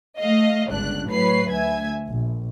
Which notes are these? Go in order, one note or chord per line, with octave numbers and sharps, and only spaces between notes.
A3 D#5 F5
G1 C#2 D4 F#6
A2 F#3 B4 C#5 B5 C7
D2 E5 G#5 G#6
A#1